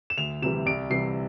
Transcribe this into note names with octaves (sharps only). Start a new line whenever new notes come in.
E7
D2 F7
C3 E3 G3 E7
C2 D7
C3 E3 G3 C7